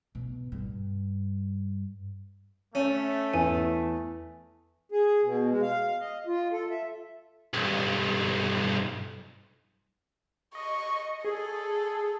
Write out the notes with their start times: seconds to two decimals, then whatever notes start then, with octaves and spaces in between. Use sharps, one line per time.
0.15 B2
0.52 G2
2.75 A3 C#4
3.34 E2 G#5
4.91 G#4
5.23 B2
5.50 G#3
5.62 F5
6.00 D#5
6.27 F4
6.53 A4
6.70 E5
7.54 B1 G2
10.55 D#5 C#6
11.24 G#4 A4